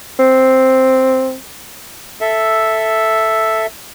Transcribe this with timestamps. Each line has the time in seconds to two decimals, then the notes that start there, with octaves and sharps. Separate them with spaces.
0.19 C4
2.21 A4 E5